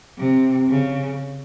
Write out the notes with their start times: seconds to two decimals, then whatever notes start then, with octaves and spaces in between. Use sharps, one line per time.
0.19 C3
0.70 C#3